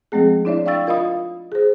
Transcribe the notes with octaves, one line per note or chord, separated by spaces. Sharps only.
F3 G#3 A3 C4 G#4
D4 E4 C#5 D5 E5
D5 F5 G5 C#6 E6 A6
F4 A#4 D#5 F5 B5 D#6
G#4 C5